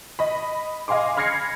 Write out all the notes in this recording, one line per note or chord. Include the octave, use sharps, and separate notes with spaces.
D#5 B5
D#5 F5 G#5 C6 D6
B5 F6 G#6 A#6 C7 C#7